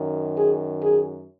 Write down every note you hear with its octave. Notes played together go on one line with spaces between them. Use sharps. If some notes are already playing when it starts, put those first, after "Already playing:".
Already playing: F#2 D#3
G#4
G#4